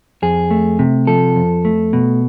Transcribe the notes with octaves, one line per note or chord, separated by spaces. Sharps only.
F2 G#4
A3
C3
F3 A4
F2
A3
B2